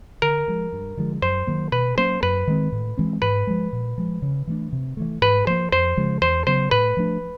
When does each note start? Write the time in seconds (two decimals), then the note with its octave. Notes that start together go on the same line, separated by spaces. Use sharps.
0.22 D3 A#4
0.48 F3 G#3
0.73 G2
0.97 D3 F3 G#3
1.22 F#2 C5
1.47 D#3 F#3 A#3
1.72 B2 B4
1.97 F#3 A#3 C#4 C5
2.22 F#2 B4
2.47 D#3 G#3 C4
2.72 A2
2.97 E3 G#3 C4
3.22 G#2 B4
3.47 F3 G#3
3.73 A#2
3.98 F3 G#3
4.22 C#3
4.47 E3 A3 D4
4.72 C3
4.97 E3 A3
5.22 G#2 B4
5.47 F3 A#3 C5
5.72 F2 C5
5.97 C#3 F3 G#3
6.22 E2 C5
6.47 C#3 F#3 B3 C5
6.71 A2 B4
6.97 F3 A3 D4